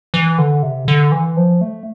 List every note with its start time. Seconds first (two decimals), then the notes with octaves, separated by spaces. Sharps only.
0.14 E3
0.38 D3
0.63 C3
0.88 D3
1.12 E3
1.37 F3
1.61 A3